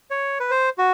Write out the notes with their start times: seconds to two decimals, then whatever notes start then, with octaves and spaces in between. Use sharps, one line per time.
0.11 C#5
0.40 B4
0.51 C5
0.78 F#4